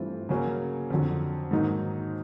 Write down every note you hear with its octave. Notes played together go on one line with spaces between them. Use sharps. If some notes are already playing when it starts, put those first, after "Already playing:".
Already playing: G2 E3 A3 C4 F4
C#3 F#3 A#3 C#4
F2 D3 F#3
G#2 D#3 F#3 A#3 D#4